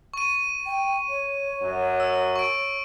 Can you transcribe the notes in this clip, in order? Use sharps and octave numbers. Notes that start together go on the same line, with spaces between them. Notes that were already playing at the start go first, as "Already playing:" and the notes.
C#6 D#7
G5
C#5
F#2 F#3
E6
C#6 D7